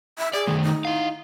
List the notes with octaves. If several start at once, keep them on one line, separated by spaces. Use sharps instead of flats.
E5
G#4 D5
D#3 A3
D#4
E4 F5